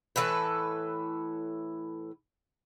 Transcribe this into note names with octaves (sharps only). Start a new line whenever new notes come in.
A2 E3 A4 B4